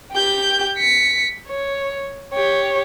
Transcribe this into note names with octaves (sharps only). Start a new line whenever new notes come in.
G4 G6
B6 C#7
C#5
G4 C#5